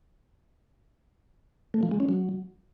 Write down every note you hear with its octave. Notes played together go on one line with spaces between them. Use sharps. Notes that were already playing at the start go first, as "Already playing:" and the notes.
A3
F3
G#3
C#4
F#3